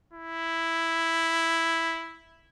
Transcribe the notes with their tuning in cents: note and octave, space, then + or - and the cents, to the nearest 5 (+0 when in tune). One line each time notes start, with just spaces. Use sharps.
E4 +0